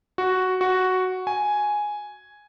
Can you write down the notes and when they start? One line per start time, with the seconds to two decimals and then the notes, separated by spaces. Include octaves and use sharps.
0.18 F#4
0.61 F#4
1.27 G#5